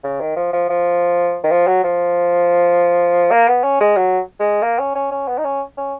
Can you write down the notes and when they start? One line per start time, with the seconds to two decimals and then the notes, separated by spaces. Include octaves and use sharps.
0.04 C#3
0.20 D#3
0.36 F3
0.53 F3
0.69 F3
1.44 D#3
1.51 F3
1.67 F#3
1.84 F3
3.31 A#3
3.48 B3
3.64 C#4
3.80 G#3
3.97 F#3
4.40 G#3
4.62 A#3
4.79 C#4
4.95 C#4
5.11 C#4
5.28 B3
5.38 D#4
5.44 C#4
5.77 C#4